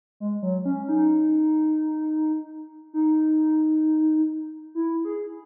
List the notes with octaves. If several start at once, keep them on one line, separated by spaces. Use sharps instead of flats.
G#3
F#3
C#4
D#4
D#4
E4
G#4